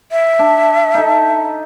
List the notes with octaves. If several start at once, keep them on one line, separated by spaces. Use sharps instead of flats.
E5
D4
D#4 A4